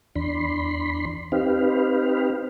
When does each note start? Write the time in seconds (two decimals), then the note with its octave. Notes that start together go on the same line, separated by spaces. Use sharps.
0.15 E2 D4 B5 C6
1.32 C4 D#4 G4 B4 F5